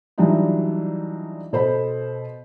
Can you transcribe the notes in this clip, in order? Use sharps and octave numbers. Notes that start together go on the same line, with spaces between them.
E3 F#3 G3 D4 D#4 F4
B2 A4 C5 B5